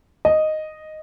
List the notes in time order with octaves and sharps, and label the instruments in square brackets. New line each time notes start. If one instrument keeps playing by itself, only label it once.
[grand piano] D#5